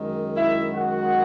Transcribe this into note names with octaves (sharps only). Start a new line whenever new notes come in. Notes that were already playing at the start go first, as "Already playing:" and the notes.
Already playing: F#2 D#3 G#3
E4 E5
F#4 F#5